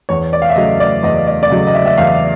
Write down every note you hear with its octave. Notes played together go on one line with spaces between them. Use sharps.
E2 C#5
D5
F5
E5
C#3 F#3 A3 D#5
D5
E2 D#5
D5
D5
C#3 F#3 A3 D#5
D#5
E5
E5
E2 F5